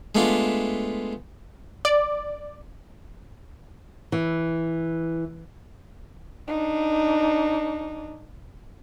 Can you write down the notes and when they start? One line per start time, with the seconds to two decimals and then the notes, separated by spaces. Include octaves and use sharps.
0.15 G#3 A3 B3 D4 F4
1.85 D5
4.12 E3
6.48 D4 D#4